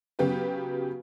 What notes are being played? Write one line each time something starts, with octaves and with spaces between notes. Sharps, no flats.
C#3 F#3 B3 G4 B4